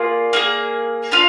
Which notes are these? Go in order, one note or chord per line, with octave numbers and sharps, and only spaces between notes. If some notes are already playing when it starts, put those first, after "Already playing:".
Already playing: A#3 F4 G#4 D5
A#3 F4 G#4
D4 F4 F5